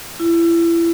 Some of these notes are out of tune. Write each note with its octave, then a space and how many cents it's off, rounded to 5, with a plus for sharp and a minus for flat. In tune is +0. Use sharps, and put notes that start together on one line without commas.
E4 +30